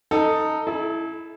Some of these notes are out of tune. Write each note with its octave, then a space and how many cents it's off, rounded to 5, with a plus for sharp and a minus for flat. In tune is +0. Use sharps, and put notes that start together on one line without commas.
D#4 +0 A4 +15
E4 +0 A4 -40